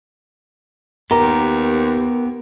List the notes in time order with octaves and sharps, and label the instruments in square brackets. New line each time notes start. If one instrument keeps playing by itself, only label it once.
[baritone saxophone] D#2 [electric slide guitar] B3 G4 [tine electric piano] A#4 [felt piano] A#5